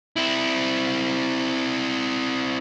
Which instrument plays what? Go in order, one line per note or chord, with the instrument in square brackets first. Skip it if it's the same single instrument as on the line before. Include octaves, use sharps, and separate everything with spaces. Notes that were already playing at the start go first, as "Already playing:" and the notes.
[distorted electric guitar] C4 E4